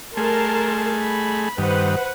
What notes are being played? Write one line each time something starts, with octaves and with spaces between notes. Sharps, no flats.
A3 G#4 A#4 A5 C6
B5
G2 D#3 B4 C5 F#5